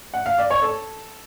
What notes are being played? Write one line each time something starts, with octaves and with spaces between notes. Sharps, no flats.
F#5
F5
D5
C#5
A4